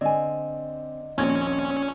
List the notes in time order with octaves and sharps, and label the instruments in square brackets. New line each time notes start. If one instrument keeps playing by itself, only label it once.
[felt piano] D3 D5 [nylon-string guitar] C4 G#5 [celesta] D#5
[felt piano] A#1 G#6 [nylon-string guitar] D#2 A#3 C4 [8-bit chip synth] C#4